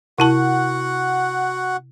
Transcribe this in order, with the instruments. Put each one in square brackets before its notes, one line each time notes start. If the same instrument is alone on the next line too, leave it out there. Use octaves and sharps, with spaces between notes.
[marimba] C3 E4 A5 [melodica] F#4 F#5